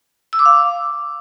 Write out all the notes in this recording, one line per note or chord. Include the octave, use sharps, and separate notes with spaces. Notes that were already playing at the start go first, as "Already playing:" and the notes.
E6
D6
F5